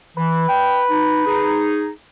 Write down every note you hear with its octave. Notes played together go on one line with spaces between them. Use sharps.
E3 B4
G5
D#4
D#4 G#4